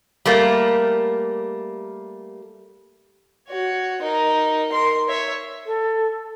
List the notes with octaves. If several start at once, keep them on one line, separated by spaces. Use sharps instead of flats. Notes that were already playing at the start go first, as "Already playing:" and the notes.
G3 A3 A#3
F#4 C#5
D#4 A#4
A#4 C6
C#5 E5
A4